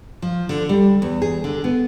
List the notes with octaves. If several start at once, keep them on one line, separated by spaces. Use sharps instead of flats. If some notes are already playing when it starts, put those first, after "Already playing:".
F3
D3
G3
E2
G#4
D3
B3